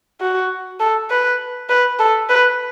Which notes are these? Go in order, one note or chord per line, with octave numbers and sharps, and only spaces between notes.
F#4
A4
B4
B4
A4
B4